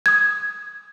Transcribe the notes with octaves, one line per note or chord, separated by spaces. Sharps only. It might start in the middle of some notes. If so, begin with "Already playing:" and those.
D#6 G#6